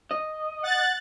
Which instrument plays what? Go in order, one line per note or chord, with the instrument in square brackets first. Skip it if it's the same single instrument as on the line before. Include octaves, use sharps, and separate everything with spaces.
[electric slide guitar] D#5
[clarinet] F#5 [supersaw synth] F#6 A6